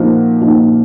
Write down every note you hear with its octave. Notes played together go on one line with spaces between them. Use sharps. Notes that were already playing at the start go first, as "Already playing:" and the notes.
Already playing: A#2 F3 A#3 D#4 F#4
A#2 F3 A#3 D#4 F#4